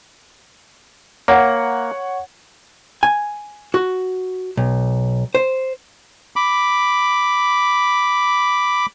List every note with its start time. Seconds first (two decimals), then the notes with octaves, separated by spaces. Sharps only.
1.28 A#3 C#5 F#5
3.03 G#5
3.74 F#4
4.57 B1
5.35 C5
6.36 B5 D6